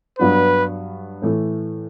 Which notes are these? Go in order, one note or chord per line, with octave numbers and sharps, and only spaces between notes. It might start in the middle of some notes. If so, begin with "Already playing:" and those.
G2 F#3 B3 D4 B4
A2 E3 A3